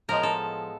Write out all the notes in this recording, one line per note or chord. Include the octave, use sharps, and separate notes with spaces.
A2 F3 G#3 B3 A#4
A4